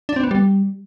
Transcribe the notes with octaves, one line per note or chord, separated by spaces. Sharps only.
D4
C4
B3
G3